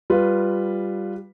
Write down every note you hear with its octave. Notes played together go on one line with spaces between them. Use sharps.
G3 F4 B4